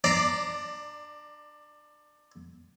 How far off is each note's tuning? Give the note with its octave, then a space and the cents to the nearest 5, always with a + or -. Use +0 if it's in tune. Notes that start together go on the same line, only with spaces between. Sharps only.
D4 +20 D5 +0 A#5 +0